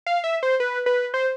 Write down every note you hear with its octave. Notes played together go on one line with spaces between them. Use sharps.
F5
E5
C5
B4
B4
C5